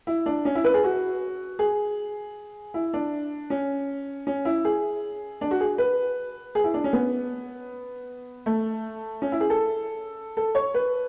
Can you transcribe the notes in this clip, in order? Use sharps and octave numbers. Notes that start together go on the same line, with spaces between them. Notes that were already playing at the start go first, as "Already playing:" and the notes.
E4
D4
C#4
E4
B4
G#4
F#4
G#4
E4
D4
C#4
C#4
E4
G#4
D4
F#4
G#4
B4
G#4
E4
D4
C#4
B3
A3
C#4
E4
G#4
A4
A4
C#5
B4